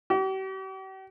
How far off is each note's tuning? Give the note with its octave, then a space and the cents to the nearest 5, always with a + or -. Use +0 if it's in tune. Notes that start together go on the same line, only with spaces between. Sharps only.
G4 -45